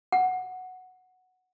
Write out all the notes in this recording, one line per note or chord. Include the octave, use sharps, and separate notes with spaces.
F#5